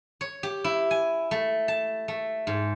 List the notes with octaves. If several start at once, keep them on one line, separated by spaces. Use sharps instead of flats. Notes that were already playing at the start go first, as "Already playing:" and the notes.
C#5
G4
E4
G#5
A3
A5
A3
G#2